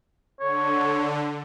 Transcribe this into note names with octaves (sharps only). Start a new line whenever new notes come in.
D3 C#5